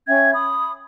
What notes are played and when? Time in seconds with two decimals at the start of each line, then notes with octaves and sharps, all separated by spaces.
0.08 C#4 E5 G5 G#6
0.33 B5 D#6